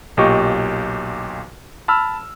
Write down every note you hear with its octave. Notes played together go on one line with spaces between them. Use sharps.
B1 A#2 G4 D#5 C#6
A5 B5 E6 F6